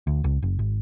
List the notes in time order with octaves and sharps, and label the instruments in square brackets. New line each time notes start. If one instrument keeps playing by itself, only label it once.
[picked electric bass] D2
C#2
F#1
G#1